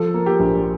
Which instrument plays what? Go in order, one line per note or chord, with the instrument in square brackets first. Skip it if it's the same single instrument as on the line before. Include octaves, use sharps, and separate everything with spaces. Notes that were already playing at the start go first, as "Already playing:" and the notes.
Already playing: [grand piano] F3 [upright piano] A4
[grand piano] A#3
[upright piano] G4
[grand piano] A#1